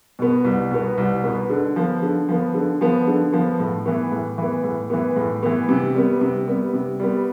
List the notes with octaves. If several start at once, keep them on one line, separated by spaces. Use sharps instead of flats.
B2 B3
C2
B2 B3
C2
B2 B3
D3
F3 B3
D3
F3 B3
D3
F3 B3
D3
F3 B3
A2
E3 B3
A2
E3 B3
A2
E3 B3
A2
E3 B3
C3
G3 B3
C3
G3 B3
C3
G3 B3